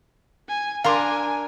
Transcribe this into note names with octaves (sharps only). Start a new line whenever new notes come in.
G#5
D4 A#4 F5 G#5 C6 D6